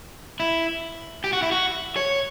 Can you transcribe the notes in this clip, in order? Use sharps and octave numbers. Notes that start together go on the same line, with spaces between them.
E4
G4
F#4
E4
F#4
C#5